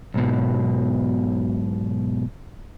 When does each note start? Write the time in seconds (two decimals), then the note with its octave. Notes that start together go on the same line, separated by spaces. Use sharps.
0.14 B1 G#2 B2